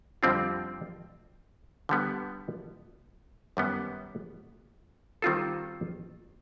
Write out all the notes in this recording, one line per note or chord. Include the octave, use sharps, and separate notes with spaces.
F2 D3 G3 C4 F4
D3 G3 B3
F#2 D#3 G3 B3
D#3 G3 C4 F4 A4